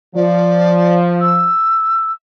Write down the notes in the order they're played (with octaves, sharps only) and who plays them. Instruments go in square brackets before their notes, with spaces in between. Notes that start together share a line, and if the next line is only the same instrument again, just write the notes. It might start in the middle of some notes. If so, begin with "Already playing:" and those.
[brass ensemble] F3 [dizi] D5
[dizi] E6